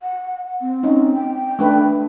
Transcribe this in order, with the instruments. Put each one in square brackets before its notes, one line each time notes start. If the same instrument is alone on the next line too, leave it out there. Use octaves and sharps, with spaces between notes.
[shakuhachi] F#5
C4
[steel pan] C#4 D#4
[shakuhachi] G5
[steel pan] A3 D4 B4